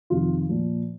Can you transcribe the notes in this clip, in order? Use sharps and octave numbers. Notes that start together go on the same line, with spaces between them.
F2 C3 D#3 F4
A#2 F3